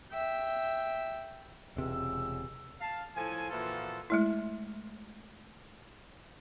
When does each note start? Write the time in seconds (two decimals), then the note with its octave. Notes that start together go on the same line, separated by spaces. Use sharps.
0.12 E5 G5
1.77 E1 C#2 C3 E6
2.81 F5 A5
3.16 A2 F3 A4 G#5
3.50 A#2 E3 F3 F4 F#4 A4
4.10 G#3 A3 E4